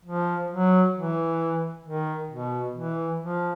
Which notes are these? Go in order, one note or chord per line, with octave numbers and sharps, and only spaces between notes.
F3
F#3
E3
D#3
B2
E3
F3